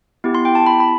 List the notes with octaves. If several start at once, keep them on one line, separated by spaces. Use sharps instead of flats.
B3 E4 G4
C6
G5
A5
B5
B5